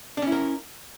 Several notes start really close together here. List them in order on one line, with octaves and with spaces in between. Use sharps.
D4 C#4 E4 A#4